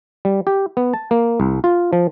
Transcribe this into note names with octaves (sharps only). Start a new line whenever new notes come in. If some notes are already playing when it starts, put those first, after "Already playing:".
G3
G4
B3
A5
A#3
C2
F4
F3